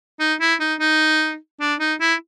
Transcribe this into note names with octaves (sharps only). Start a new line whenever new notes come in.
D#4
E4
D#4
D#4
D4
D#4
E4